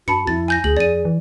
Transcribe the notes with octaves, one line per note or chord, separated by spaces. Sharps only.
G2 F#4 A5 B5 C#7
F2 E4 A6
G#5 G6 A#6
D2 G#4 F#7
F2 D5 D#7
E3